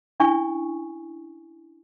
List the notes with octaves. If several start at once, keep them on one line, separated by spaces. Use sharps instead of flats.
C#4 D4 E4 G#5 C#6